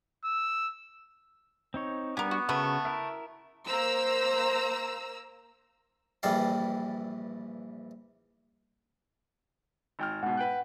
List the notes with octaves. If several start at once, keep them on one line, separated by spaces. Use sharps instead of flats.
E6
C4 D#4 C#5
G3 B3 D4 G4 A#4 G#5
F#4
C#3 A3 F#4 A#4 B4
E4 A#4 E5
A#3 C5 A#5 E6
A#1 G2 E3 G3 A4 F5
G#1 G5 F6
G#2 B2 F#5
B4 G5 F#6